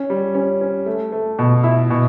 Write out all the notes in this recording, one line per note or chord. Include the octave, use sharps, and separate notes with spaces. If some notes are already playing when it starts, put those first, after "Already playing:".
Already playing: C#4
G3
C#4
C#4
A3
A3
B2
E4
B2